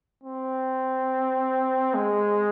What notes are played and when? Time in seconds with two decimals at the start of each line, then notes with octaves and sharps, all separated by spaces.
0.24 C4
1.94 G#3